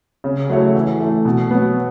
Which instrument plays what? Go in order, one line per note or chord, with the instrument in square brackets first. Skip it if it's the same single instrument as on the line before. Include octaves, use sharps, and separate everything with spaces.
[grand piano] C#3
F#3 A3 E4 C#5
E3
A3 E4
B2
F#3 B3